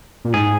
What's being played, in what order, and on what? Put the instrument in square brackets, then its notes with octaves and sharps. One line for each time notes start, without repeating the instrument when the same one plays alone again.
[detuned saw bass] A#2
[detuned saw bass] G#2 [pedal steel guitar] G#4